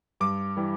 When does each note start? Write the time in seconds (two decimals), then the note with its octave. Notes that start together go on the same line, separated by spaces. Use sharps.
0.21 G2 D6
0.57 E3 G3